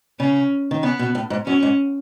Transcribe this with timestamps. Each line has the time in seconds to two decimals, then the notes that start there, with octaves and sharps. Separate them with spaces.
0.19 C#3 C#4
0.71 D#3
0.82 C#3 B3
0.99 B2
1.15 A2
1.30 G#2
1.46 F#2 C#4
1.63 G#2